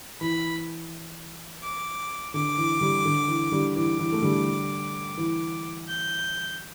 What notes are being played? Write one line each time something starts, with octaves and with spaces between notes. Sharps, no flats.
E3 B5
D6
D3 D6
E3
D3 G3
D3
E3
D3 G3
E3 D6
E3
A3
D3 G3
E3
G6